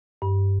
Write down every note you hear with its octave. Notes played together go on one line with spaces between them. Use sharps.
G2